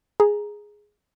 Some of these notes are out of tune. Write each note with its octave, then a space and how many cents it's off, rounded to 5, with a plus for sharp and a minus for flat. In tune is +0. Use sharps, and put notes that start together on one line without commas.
G#4 +0 A#5 +0